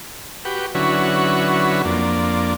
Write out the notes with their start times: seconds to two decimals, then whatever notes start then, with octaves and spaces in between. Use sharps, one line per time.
0.45 F#4 G4 B4
0.75 D3 F#3 C#4 E4 F#4 B4
1.85 F2 A#3 D4